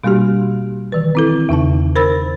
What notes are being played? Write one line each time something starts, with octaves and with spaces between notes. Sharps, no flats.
B2 G3 A#3 D4 F#4 G4
D#3 E3 B4
C4 E4 A4
E2 C#3 D#4 A5
A#4 C5 B5 E6 A6